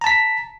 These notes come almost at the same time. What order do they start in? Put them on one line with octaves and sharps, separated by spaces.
A#5 A5 B6